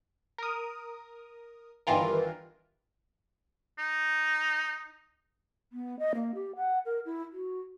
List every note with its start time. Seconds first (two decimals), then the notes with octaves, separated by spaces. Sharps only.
0.38 A#4 D#6
1.87 G1 G2 D#3 E3 F4 A#4
3.78 D#4
5.72 B3
5.99 D#5
6.15 A#3
6.35 G4
6.56 F#5
6.86 A#4
7.05 E4
7.33 F#4